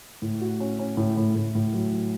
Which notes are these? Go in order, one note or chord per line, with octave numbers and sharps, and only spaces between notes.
A2
F#4
C#4
C#4
A2
A2
A2
A2
F#3
F#3